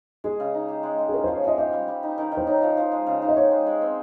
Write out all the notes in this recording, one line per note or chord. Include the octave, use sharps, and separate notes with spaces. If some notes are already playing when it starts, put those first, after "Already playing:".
G#3 G#4
C#3
D#4
G4
G#3
G#3
G#4
C#4 A#4
F3 C5
C#5
F3 D#5
G4 D#5
G3
G3
D#4
D#3
D#3
C5
D#4 C#5
F3
F3
G#3
C#3
D#4
D#5
G4 C#5
G#3
G#3
C4